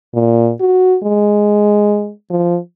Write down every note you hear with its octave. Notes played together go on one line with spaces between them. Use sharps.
A#2
F#4
G#3
F3